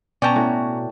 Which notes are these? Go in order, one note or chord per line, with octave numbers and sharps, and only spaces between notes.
B2 C#4 D5 G5 A5 A#5
A2 F#4